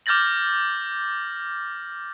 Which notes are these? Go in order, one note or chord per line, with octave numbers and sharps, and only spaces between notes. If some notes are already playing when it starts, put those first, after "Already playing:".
D6 F6 G6 A6 A#6 F#7